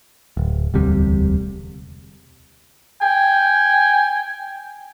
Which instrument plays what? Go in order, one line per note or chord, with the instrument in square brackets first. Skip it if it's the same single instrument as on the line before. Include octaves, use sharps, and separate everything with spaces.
[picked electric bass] D1
E1 D2 C3 G3
[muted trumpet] G5 [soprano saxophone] G#5